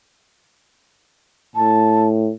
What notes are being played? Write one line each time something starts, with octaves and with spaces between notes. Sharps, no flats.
A2 A5